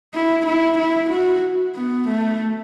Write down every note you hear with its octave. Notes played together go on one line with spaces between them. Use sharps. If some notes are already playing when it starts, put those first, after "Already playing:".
E4
E4
E4
F#4
B3
A3